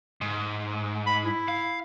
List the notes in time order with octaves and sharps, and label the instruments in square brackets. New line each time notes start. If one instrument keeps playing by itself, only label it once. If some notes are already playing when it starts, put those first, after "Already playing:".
[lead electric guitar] G#2
[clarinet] B5
E4
[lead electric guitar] F5